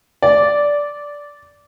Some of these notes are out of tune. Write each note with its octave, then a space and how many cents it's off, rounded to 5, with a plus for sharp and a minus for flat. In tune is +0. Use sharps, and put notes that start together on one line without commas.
D5 -10